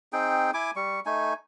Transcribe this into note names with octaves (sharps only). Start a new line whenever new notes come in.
C4 D#4 G#4 G5
E4 G#5 D6
G3 C#6
A3 D#4 G#5